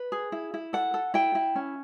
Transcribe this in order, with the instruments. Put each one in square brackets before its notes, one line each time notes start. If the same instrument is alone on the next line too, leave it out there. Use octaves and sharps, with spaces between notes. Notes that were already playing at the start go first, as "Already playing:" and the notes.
Already playing: [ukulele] B4
G#4
E4
E4
A4 F#5
A4
E4 G5
E4
C#4